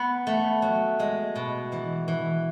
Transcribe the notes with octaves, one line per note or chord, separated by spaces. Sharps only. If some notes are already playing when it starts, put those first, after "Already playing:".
Already playing: B3
A3
F#3
G#3
B2
E3
E3